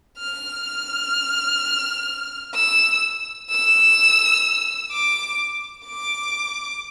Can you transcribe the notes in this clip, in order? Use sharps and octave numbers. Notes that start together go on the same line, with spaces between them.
F6
F6
E6
E6
D6
D6